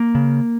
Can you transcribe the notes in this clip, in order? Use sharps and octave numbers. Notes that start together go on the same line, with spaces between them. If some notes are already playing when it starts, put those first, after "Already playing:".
Already playing: A#3
C#3